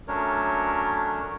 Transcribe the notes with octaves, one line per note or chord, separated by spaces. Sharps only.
F#3 A3 C#4 D4 A#4 C#5